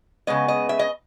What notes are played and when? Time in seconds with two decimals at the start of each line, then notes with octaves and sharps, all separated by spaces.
0.27 C#3 G#3 B3 D#5
0.48 D#5
0.69 E5
0.79 D#5